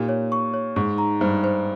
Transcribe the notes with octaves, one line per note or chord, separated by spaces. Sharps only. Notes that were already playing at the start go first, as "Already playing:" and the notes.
Already playing: A#2 D#4 G4
C#5
C#6
C#5
G#2 C#6
A#5
G2 C5
C5